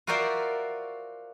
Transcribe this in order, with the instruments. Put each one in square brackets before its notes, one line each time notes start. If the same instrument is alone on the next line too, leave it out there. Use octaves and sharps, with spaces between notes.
[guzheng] F4 F#4 A#4 C5 D5 E5